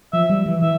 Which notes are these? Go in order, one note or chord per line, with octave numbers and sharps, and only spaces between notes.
F3 E5
G3
E3
E3 E5